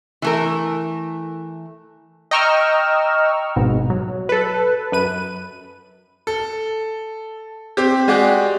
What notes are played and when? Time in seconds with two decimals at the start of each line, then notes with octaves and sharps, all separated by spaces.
0.22 E3 A3 A#4
2.31 D#5 G5 A#5 C#6 E6 F6
3.56 G#1 G#2 B2
3.90 F#3
4.29 A4 B4
4.92 F#2 B4 D#7
6.27 A4
7.77 C4 G4
8.08 G#3 F#4 G4 D5